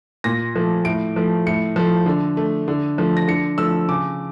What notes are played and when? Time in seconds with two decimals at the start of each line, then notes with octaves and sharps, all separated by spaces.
0.24 A#2 A#6
0.56 F3 A3
0.85 A2 D7
1.16 F3 A3
1.47 A2 C#7
1.76 F3 A3
2.06 D3
2.37 A3
2.68 D3
2.98 F3 A3
3.17 A#6
3.28 D3 C#7
3.58 F3 A3 E6
3.89 C#3 D6